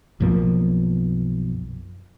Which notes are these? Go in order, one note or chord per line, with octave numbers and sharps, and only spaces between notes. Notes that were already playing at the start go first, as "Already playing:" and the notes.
B1 F#2 F3 A#3